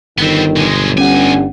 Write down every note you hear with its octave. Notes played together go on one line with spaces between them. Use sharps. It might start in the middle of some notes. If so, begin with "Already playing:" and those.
G1 D#3 B3 C4
B1 G#3
D2 G2 C#4 F#5 G#5